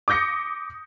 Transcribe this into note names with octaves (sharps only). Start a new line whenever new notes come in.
D6 D#6 G6 A#6 C#7